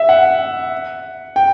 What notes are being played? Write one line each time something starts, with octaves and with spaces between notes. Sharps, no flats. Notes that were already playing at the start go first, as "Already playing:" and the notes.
Already playing: E5
F#5
G5